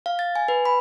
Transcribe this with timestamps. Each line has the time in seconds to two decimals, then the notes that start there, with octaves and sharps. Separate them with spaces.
0.06 F5
0.19 A6
0.36 G#5
0.48 B4
0.65 B5